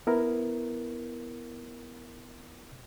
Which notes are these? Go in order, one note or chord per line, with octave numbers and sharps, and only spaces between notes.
B3 E4 A#4